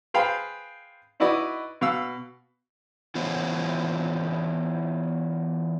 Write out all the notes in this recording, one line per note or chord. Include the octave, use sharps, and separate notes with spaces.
G#4 B4 C5 F5 G5 A5
D#4 E4 F#4 B4 D5 D#5
B2 F5 E6
E3 B3 F4 C5 C#5